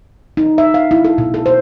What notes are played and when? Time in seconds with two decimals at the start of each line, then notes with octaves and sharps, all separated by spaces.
0.37 D#4
0.58 E5
0.74 F5
0.91 E4
1.04 A4
1.18 B2
1.34 A4
1.46 C5